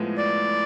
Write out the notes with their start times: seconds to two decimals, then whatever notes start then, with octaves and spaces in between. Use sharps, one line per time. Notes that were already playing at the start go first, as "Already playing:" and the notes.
Already playing: A2 F3 G#3 B3
0.17 D5